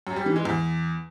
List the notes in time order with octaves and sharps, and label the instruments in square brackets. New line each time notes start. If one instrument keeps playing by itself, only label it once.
[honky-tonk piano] F#2
G3
E3
G#3
E2